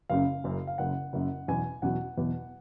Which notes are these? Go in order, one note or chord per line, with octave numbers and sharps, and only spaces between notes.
F#1 F#2 C#3 F5
F#1 F#2 C#3
F5
F#1 F#2 C#3 F#5
F#1 F#2 C#3
E2 B2 F#3 G#5
E2 B2 F#3 F#5
E2 B2 F#3